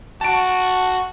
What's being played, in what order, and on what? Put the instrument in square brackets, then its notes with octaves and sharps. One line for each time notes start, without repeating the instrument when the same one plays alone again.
[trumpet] F#4 [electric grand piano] A5 D7